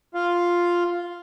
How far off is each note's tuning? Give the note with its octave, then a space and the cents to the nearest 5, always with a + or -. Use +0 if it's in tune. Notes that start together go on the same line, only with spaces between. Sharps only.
F4 +0 F5 +0